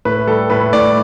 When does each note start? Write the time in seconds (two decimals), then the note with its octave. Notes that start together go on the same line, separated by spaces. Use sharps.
0.05 A2 B4
0.27 G3 A4
0.50 A2 B4
0.73 A2 D5